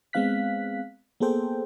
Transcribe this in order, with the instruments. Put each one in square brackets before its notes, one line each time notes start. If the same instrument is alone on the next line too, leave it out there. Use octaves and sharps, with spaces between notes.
[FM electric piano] G#3 B3 C4 F5 F#6 B6
A#3 B3 G#4 A4 C5 G5